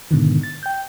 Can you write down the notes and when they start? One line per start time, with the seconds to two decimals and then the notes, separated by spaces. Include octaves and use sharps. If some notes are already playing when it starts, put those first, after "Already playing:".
0.11 G#2 B2 D3 D#3
0.43 A6
0.63 G5 G6